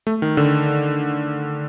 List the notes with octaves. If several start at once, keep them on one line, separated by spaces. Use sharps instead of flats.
A3
D#3
D3